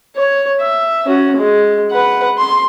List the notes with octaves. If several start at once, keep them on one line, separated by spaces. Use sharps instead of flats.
C#5
E5
C#4 F#4
G#3
B4 F#5
C6